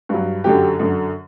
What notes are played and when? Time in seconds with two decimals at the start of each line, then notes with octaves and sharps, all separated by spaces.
0.09 G2 F#3
0.44 F#2 D3 F#3 G4
0.79 F#2 D3 F#3